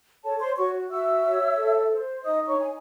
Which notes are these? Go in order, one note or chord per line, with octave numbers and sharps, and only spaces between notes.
A4 C#5 A5
C5 C6
F#4 C#5 C#6
F#4 E5 E6
C#5
A4
C5
D#4 D#5 D#6
C#5 C#6
D#4 G#5